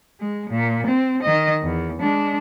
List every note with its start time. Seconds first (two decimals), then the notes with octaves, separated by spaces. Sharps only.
0.20 G#3
0.50 A#2
0.87 C4
1.23 D#3 D#5
1.63 E2
2.01 G#3 D4